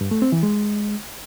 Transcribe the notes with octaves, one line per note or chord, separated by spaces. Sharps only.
G2
A3
C4
E3
G#3